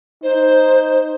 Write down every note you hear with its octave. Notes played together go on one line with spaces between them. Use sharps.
D#4 C5